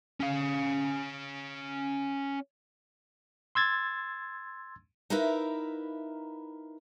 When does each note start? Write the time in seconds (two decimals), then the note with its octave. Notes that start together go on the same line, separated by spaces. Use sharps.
0.20 C#4 F5
3.55 C6 E6 G#6 A6
5.10 D#4 E4 A#4 B4 E5 F5